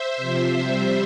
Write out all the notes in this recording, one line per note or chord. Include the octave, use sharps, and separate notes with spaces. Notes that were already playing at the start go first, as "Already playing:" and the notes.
Already playing: C5 E5
C3 F3
C3 G3